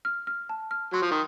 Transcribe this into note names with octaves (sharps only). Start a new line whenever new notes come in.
F6
F6
A5
F6
F#3 C6
F3
D#3